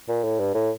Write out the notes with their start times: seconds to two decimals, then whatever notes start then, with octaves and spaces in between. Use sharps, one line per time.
0.08 A#2
0.24 A2
0.39 G2
0.55 A2